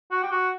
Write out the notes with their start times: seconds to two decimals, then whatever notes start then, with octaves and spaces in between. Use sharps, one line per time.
0.11 F#4
0.23 G4
0.31 F#4